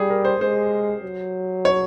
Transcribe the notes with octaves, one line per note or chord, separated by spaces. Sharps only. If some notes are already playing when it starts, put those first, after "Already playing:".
Already playing: G3 G4 G#4
A#4
C5
G#3 C5
F#3
C#5